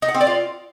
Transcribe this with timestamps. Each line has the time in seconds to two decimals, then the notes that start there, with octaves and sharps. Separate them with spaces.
0.02 D#4
0.08 F#5
0.14 C4
0.21 D5
0.27 F4